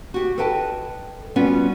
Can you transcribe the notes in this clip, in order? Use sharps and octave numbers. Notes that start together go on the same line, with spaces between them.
F#4 G4
A4 B4 D#5 G5 A5
G3 B3 C#4 F4 F#4